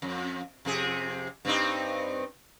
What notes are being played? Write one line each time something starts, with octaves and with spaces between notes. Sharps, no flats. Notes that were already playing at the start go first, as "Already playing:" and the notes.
F2
F2 C3 G#4
G2 C4 D#4